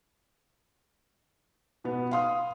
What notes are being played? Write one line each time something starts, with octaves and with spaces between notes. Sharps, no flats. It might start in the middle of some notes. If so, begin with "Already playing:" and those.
B2 B3
F5 C6 D#6